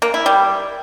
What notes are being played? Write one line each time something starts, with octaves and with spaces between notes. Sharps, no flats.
A#3
E4
G3